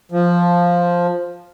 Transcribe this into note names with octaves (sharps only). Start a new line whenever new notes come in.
F3